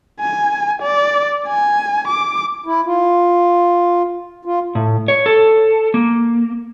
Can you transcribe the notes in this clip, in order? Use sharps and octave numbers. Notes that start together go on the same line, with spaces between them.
G#5
D5
G#5
D6
E4
F4
F4
A2
C#5
A4
A#3